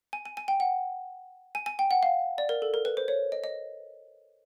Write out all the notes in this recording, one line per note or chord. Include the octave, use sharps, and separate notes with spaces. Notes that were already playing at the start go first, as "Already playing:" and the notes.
G#5
G#5
G#5
G5
F#5
G#5
G#5
G5
F#5
F5
D5
A#4
A4
A#4
B4
C5
C#5
D#5
D#5